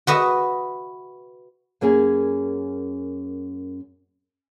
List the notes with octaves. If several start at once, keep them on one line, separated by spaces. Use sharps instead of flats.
F#4 B4 D#5 E5
F#2 A#3 C#4 G#4